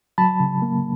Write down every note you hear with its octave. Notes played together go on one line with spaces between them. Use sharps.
F#3 A5 B5
C#3
A#3